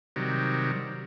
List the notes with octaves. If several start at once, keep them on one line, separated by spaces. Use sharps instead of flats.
C3 D#3 F#3 G3